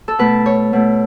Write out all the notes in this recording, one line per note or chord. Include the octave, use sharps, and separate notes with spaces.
A4
B2 A3 B4
C#5
B2 A3